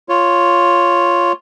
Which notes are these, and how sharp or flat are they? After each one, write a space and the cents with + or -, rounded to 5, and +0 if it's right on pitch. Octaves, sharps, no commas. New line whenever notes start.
F4 +0 C#5 +0